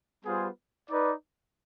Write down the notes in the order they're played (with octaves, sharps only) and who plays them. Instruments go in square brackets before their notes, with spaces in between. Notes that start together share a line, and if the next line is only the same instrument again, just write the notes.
[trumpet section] G3 B3 F4 G#4 C5
D#4 B4 D5